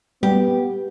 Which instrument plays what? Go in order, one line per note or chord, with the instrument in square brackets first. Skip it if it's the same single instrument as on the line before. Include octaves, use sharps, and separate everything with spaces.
[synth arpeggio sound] G3 [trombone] B3 [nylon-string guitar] G4